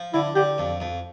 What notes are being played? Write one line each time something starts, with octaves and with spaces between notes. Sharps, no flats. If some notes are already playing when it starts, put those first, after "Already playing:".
Already playing: F3
D3 E4
D3 G4
F2
F2